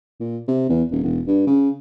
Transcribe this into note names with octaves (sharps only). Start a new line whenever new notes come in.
A#2
C3
E2
D#1
E1
G2
C#3